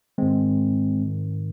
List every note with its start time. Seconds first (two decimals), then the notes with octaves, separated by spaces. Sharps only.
0.18 G#2 D#3 G#3 C4
1.01 G#2 D#3